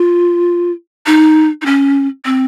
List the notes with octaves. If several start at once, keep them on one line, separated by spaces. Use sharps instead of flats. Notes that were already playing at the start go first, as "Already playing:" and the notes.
Already playing: F4
D#4
D#4
C#4
C4